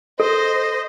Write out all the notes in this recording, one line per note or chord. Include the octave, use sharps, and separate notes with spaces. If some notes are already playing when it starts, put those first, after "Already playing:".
A4 C5 D#5